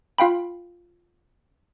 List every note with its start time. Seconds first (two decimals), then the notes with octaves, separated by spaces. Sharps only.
0.18 F4 F5 G5 B5